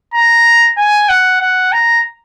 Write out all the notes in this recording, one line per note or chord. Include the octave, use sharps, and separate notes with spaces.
A#5
G#5
F#5
F#5
A#5